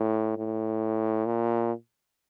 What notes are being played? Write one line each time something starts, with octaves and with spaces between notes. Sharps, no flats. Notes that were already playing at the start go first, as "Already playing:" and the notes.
Already playing: A2
A2
A#2